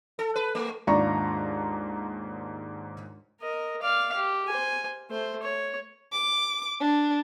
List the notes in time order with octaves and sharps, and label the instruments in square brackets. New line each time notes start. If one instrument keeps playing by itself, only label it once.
[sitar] A4
B4
A3
[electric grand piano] D#2 G#2 [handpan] G#3 D4 F4 [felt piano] D5 A#5 C#6
[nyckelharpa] A#4 D#5
D5 F5
G4
C5 G#5
A3 C5
C#5
[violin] D6
D4